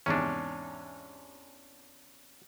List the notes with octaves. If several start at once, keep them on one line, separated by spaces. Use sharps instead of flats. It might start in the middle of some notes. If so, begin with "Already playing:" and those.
E2 G#2 C3 C#4 D4